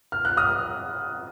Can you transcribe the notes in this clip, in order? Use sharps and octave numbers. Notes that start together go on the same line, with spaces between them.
F6
F#6
D#6 F6